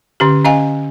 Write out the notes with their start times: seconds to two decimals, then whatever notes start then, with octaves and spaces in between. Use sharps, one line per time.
0.20 D3 C#4 G4
0.45 C#4 D#5 F5 G#5